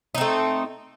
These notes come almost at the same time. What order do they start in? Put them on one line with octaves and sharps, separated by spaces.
D#4 C4 A3